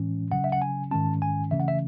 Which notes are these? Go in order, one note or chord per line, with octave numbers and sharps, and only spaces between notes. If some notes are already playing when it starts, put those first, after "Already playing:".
Already playing: A2 E3 G#3 C#4
C#3 F#3 C#4 F#5
E5
F#5
G#5
G#2 D#3 G#3 C#4 A5
G#5
C#3 E3 A3 C#4 E5
F#5
E5